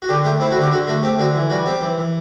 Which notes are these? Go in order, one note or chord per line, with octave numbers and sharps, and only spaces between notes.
F#4
D3 G4
A3 G4
C4 E4
F#4
D3
G4
D3 F#4
A3 F#4
C4 G4
D3 F#4
E3
G3 F#4
C4 G4
E3
E3